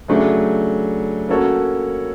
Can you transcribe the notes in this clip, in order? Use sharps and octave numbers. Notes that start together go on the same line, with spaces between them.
C#3 F#3 A3 D4
A#3 C#4 F#4 A4 C#5